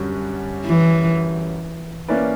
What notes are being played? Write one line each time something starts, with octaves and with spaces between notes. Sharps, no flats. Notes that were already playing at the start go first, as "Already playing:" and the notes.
Already playing: F#2 D3 G3 C#4 F#4
E3
A#3 C#4 E4 B4 D5